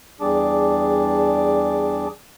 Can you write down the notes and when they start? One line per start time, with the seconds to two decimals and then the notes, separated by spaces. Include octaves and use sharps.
0.20 E2 G3 D4 G#4 A5 D6